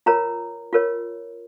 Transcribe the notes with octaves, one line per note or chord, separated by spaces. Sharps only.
F4 A#4 C#5 A#5
F4 A#4 C#5